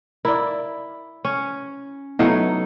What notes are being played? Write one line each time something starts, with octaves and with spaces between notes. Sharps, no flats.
E4 A#4 D5
C#4
F#3 A3 B3 D#4 E4 D#5